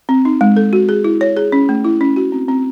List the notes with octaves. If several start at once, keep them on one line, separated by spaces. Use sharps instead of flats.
C4
D#4
G#3
A4
F#4
G#4
E4
C#5
G#4
C#4
A3
E4
C#4
F#4
C4
C4